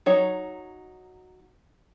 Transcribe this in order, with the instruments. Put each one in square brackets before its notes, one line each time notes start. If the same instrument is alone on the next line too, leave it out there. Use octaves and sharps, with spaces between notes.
[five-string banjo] F#3 D#4 C#5